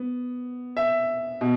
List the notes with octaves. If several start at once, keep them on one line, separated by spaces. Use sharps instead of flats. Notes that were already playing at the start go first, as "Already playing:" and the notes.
Already playing: B3
E5
B2